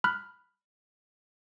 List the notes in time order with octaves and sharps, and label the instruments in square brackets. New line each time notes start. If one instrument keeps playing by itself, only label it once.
[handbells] B5 F6 F#6